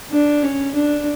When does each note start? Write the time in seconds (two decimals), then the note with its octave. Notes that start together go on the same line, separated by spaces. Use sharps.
0.11 D4
0.43 C#4
0.74 D4